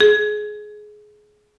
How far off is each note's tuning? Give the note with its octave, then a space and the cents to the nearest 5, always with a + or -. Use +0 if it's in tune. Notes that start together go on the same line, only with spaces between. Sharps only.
G#4 +20